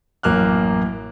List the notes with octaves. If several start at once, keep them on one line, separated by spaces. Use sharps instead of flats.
A1 F#2 A#3 F6 F#6